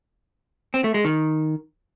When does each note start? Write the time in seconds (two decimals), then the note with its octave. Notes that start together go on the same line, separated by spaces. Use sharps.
0.74 C4
0.84 A3
0.94 G#3
1.05 D#3